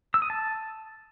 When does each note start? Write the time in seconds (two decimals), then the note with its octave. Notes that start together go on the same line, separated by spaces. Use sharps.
0.14 E6
0.22 D#6
0.30 A5